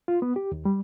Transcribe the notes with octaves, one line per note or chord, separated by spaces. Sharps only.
F4
B3
G4
D#2
G3